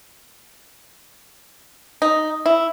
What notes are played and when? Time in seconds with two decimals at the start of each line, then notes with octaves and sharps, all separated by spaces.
2.02 D#4
2.46 E4